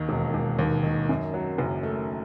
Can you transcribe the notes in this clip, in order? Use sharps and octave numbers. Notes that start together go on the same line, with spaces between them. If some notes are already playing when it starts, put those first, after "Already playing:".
Already playing: D#2 D#3
E1
E1
D#2
D#3
F#2
F#3
F#1
A3